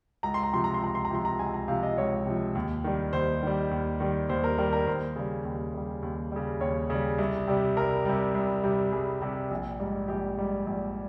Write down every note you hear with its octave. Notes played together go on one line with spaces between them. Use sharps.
C#2 A#5
C6
A#5
C3 F3 C6
A#5
C6
C#2 A#5
C6
A#5
C3 F3 C6
A#5
C#2 G#5
A#5
C3 F3 F5
D#5
C#2 C#5
C3 F3
D#2
D#3 G3
D#2 C5
D#3 G3
D#2
D#3 G3
D#2 C5
A#4
D#3 G3 A#4
A#4
D#2 C5
C#3 G3
D#2
C#3 G3
D#2
C#3 G3
D#2 C#5
C#3 G3
C2
C3 G3
C2 A#4
C3 G3
C2
C3 G3
C2 G#4
C3 G3
A#1
G#2 G3
A#1 G4
G#2 G3
A#1